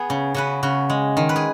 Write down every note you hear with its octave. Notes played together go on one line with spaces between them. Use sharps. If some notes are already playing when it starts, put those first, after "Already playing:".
Already playing: B3 G#4
C#3
C#3 F#4 B4
C#3 F#4
G#3
D#3
B4
G#4